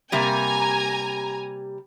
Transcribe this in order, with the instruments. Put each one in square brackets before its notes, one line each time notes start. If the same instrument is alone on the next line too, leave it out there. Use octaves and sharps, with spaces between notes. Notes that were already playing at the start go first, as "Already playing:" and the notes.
[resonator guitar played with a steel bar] C3 G3 A#3 [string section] G#5 A#5